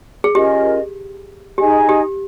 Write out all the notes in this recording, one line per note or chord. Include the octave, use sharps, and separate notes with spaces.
G#4
C#4 F4 G4 A#4 D#5
D#4 G4 G#4 D#5 G#5
G4